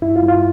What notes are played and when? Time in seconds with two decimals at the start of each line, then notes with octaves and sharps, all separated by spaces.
0.02 G2 E4
0.16 F4
0.22 G2
0.28 F4